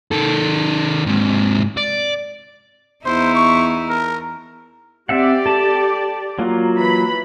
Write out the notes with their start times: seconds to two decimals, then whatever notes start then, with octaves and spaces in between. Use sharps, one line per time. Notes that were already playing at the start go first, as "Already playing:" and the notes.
0.11 D#3 A4
1.06 G#2 C3
1.77 D5
3.05 E2 D#4 E4 C5
3.35 C#6
3.89 A#4
5.09 C4 G4 D5 E5 F#5
5.46 A4 A5
6.39 F#3 A#3 F4
6.76 E3 B5